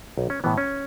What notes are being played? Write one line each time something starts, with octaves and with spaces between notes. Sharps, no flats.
B1
C#4
A2 E3 B3
C#4